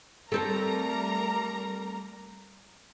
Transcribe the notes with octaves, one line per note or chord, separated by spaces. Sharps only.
G3 A3 C4 A4 A#4 A#5